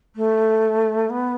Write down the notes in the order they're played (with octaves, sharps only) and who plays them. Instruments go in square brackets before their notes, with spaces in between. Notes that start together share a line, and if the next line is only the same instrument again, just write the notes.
[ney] A3
B3